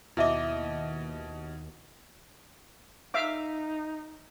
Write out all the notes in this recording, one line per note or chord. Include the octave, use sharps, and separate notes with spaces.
D#2 B2 E4 D#5 E5 D6
D#4 E5 F5 D6